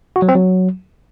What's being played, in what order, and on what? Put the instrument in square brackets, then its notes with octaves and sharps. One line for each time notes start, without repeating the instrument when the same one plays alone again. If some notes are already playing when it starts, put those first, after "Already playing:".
[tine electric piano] F#4
F#3
C4
F#3